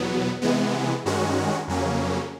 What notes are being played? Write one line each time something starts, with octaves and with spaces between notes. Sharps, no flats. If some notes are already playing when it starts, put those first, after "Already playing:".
Already playing: E2 B2 F#3 B3
C3 E3 G#3 B3
G2 D#3 G#3 C#4 F#4
F2 C#3 F#3 A#3 C#4